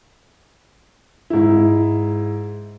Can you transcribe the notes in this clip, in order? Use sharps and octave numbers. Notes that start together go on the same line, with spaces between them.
G#2 E4